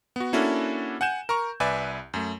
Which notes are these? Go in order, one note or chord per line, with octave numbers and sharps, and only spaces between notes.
B3 F#4
A#3 C#4 D4 E4 F#4 A4
F#5 G#5 G6 E7
A#4 A#5 C#6
C2 B4 D5 E5 G#5
F#2 A3